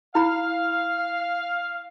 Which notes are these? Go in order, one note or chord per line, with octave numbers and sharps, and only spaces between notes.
E4 F5 B5